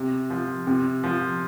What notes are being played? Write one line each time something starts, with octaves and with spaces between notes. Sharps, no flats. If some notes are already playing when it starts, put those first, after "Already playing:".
Already playing: C3
F3
C3
F3